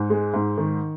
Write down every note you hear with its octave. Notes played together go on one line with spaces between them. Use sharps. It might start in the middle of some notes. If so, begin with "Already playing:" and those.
Already playing: G#2
G#3
G#2
D#3